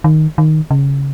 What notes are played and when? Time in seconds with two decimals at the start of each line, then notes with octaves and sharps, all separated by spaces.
0.04 D#3
0.38 D#3
0.71 C#3